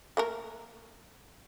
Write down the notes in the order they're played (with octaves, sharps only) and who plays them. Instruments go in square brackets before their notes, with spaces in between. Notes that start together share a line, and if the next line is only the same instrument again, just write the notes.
[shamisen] A3 A#3 A#4